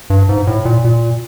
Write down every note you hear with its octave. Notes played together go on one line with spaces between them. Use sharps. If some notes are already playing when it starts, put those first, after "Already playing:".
G2
G#2
A2
A#2
A#2